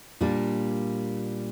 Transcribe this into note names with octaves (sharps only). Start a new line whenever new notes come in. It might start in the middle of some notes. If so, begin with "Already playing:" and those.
A#2 G3 A#3 D4